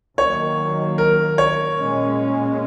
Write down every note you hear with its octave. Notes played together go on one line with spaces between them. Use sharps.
D#2 D#3 F#3 A#3 C#5
A#4
C#5
A#2 G#3 C#4